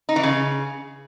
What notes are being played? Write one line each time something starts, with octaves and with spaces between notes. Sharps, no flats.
D#4
E3
C#3